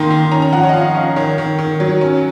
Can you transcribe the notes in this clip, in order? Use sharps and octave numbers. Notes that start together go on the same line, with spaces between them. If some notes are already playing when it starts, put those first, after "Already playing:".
Already playing: D#3 A#3 D#4 C6
D#3
C#4 A#5
A#5
F3 F#5
C#5
D#5
F3 F5
C#4
D#3 C#5
D#3
D#3
F#3
C#4